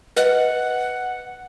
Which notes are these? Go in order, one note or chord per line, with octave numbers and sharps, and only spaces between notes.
B4 D#5 F#5